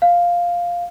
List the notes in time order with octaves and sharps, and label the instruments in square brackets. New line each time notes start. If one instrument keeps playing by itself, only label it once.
[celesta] F5